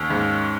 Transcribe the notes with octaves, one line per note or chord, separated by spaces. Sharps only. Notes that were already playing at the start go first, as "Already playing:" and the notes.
Already playing: D#2 C#4
G#2